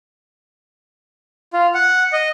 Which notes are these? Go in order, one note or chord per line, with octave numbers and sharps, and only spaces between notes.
F4
F#5
D#5